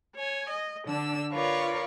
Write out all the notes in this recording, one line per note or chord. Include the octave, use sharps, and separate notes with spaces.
C#5 G#5
D#5
D3 D4 E6
F4 A#4 B4 C#5 D5